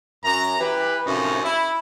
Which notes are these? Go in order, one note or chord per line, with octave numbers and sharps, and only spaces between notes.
F#2 A#5
E3 G4 B4
F#2 A2 C3 F3 C#4 D#4
E4